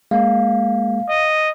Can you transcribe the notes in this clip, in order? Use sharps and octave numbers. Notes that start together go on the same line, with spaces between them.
G#3 A#3 F5
D#5